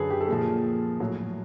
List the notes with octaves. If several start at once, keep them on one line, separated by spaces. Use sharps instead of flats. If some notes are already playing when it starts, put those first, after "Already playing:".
Already playing: F#2 D3 F#3 G#4 A4 B4
G4
A4
A#2 F3 G#4
A2 F#3